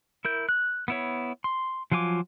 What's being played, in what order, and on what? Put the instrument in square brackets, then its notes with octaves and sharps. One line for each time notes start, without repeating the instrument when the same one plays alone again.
[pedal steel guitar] E4 A#4 G6
F#6
B3 E4 C#5
C6
F3 F#3 F4 G#5 D6